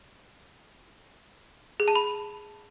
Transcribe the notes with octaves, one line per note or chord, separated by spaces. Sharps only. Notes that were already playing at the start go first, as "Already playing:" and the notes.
G#4
A5
B5